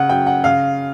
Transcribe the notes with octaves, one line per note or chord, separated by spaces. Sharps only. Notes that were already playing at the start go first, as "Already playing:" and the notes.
Already playing: C#3 F#5
F#2 G5
F#5
C#3 F5